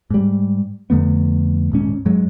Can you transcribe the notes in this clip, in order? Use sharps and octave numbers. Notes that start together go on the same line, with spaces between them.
G#2 G3
F2 D3 A3 B3
D#1 G#2 C#4
G2 F#3 G#3